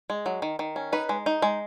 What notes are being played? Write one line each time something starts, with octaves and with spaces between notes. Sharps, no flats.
G#3
F#3
D#3
D#3
C#4
D#4 B4
G#3
D#4
G#3